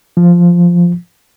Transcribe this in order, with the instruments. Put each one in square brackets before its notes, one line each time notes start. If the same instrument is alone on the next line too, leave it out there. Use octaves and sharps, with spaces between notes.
[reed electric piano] F3